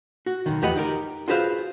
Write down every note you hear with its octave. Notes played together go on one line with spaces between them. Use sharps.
F#4
B1 G#2 D#3
E2 F3 G4 B4 D#5 F#5
D#4 G4 A#4
F4 F#4 G#4 B4 C5 F5